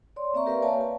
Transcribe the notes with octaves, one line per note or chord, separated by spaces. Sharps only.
C#5 D5 C6
A#3 C4 D5 E5 A#5 C#6
G4 A#4 B4 D5 E5 F5
A#3 C#5 F5 G#5 A5
A5